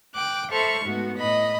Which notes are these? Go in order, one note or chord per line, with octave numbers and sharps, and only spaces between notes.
G5 D6 F#6
A4 C5 E5 B5 C#6 F6
G#2 A3 B3 F#4
A2 D#5 B5 A#6